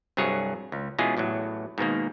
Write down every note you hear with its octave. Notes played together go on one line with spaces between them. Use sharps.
C2 G2 F#3 G#4 C#5
C#2
B2 E3 G#3 C#4 F4 G#4
A1 E2 A2 F#3
G#2 B2 D#3 A#3